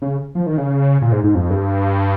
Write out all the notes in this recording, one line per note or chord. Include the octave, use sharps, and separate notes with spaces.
C#3
F3
D#3
C#3
A#2
G#2
G#2
F2
G2